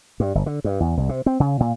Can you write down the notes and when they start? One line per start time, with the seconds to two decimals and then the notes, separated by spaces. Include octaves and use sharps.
0.20 G2
0.35 G1
0.46 D3
0.64 G2
0.80 E2
0.97 C2
1.09 C3
1.26 C4
1.40 C#3
1.60 A#2